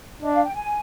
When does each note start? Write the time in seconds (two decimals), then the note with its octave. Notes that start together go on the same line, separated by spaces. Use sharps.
0.22 D4 D#5
0.34 F5
0.44 G5
0.54 G#5